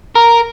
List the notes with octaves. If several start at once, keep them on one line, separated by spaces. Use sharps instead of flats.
A#4